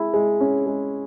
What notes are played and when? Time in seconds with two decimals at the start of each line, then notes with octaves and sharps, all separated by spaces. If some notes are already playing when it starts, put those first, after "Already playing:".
Already playing: G#3 E4
0.14 G#3
0.41 C#4
0.66 G#3